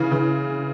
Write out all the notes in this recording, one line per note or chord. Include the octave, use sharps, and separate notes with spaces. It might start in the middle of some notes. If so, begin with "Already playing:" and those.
Already playing: C#3 E3
C#3 E3